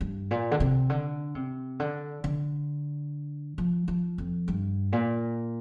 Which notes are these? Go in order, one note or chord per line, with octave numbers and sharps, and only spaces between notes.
G2
A#2
D3
C3
D3
C3
D3
D3
F3
F3
F2
G2
A#2